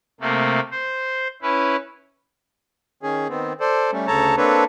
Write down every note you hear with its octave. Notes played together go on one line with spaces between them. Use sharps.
C3 A3 A#3
C5
C#4 E4 B4
D#3 C#4 G#4
D#3 B3 C4
A4 C5 D5
G3 A3 C#4
D2 C#3 A4 C#5 A5 A#5
A#3 C4 D4 A4 B4 C#5